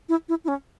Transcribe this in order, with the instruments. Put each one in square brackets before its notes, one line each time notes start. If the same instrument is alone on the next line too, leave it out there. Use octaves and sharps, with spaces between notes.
[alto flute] E4
E4
E4
C#4